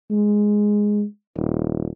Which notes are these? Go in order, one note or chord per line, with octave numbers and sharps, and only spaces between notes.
G#3
D#1